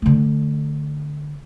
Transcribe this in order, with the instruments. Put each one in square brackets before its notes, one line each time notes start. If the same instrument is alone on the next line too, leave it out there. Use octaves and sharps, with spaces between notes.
[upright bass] D3 A3